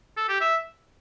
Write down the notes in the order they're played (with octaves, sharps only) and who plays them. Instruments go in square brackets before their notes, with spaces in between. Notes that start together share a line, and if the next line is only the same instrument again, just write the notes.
[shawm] A4
G4
E5